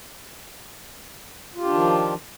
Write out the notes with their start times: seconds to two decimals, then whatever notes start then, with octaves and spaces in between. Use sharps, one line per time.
1.55 F4
1.60 G4
1.64 D4
1.69 D#3
1.74 F3